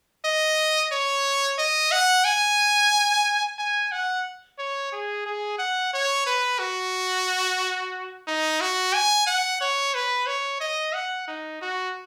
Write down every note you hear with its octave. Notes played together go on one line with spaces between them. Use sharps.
D#5
C#5
D#5
F#5
G#5
G#5
F#5
C#5
G#4
G#4
F#5
C#5
B4
F#4
D#4
F#4
G#5
F#5
C#5
B4
C#5
D#5
F#5
D#4
F#4